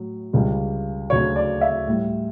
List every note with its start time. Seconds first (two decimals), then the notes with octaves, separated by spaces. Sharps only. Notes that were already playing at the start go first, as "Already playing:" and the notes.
Already playing: A2 F#3
0.33 C#2 C#3 G3
1.10 D2 C#3 F#3 C#5
1.36 D5
1.61 E5
1.87 A2 G3